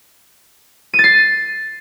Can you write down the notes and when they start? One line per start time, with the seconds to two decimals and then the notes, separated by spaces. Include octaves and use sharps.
0.94 D#7
0.99 A6
1.04 C7